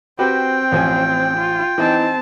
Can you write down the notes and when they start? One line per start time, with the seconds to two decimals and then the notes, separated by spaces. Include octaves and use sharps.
0.19 C4 F#4 G4 B4 G5
0.72 A1 F3 G#5
1.37 F4
1.78 E3 C4 D#4 A5